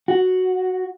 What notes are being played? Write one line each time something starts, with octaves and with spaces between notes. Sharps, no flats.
F#4